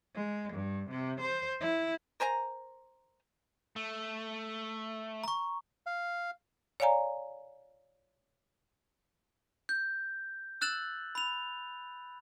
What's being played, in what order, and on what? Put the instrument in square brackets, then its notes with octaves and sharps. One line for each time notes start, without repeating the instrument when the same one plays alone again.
[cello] G#3
G2
C3
C5
E4
[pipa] A#4 C5 G#5 A#5
[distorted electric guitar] A3
[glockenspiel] A#5 C#6
[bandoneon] F5
[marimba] C#5 D5 F5 G#5 A#5
[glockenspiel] G6
E6 F#6 A6 E7 F#7
B5 F7